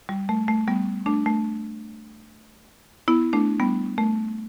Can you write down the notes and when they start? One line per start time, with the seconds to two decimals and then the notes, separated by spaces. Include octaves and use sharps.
0.09 G3
0.29 A3
0.48 A3
0.68 G3 B3
1.06 A3 D4
1.26 A3
3.08 B3 E4
3.33 A3 D4
3.60 G3 B3
3.98 A3